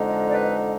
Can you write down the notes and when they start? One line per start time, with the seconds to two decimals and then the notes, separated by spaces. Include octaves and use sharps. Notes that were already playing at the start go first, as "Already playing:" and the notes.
Already playing: F2 D3 G#3 D#4
0.28 D5
0.32 B4